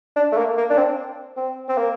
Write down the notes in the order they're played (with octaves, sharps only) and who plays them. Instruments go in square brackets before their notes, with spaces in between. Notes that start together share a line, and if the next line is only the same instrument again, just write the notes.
[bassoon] D4
A3
A#3
A#3
D4
C4
C4
C4
A#3